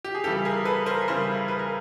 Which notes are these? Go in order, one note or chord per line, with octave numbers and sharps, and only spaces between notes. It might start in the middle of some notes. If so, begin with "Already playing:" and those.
G4
G#4
C#3 E3 G3 G4 A4
G#4 A#4
A4 B4
A#4 C5
C#3 E3 G3 A#4 C5
B4
A#4